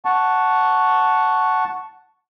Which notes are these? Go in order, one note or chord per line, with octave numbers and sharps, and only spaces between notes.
F#5 A5 C#6